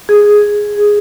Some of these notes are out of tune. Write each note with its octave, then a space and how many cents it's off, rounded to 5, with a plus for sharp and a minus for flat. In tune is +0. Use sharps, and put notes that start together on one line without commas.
G#4 +0